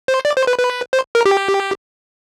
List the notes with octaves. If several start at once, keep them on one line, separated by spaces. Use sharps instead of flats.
C5
D5
C5
B4
B4
C5
A#4
G4